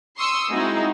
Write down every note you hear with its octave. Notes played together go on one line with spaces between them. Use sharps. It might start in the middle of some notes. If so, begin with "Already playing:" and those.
C6 C#6 D#6 E6
G#3 C4 D#4 E4 F#4 G#4